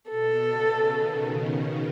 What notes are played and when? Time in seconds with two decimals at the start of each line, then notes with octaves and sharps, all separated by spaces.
0.10 B2 A4
0.52 C#3
0.94 B2 D#3
1.37 C#3